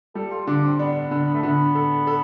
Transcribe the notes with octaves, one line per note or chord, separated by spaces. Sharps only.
G3 A4
F4
D3 D4
C4
B3 D4
D3
A3
D3 B3
A4
A4